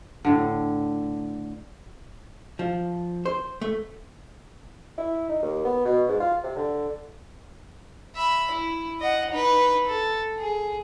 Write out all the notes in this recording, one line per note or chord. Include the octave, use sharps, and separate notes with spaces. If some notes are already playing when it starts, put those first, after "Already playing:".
A2 D3
F3
C5
A3
E4
D#4
D#2
B3
B2
G#2
F4
C3
D3
E5 B5
E4
D#5 F#5
D#4 B4
A4
G#4